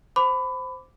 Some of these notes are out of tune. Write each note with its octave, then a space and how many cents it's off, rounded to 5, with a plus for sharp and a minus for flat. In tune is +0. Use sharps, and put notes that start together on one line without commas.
C5 -5 B5 +20 D6 -10